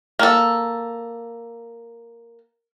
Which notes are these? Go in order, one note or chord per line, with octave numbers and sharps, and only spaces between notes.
A#3 A4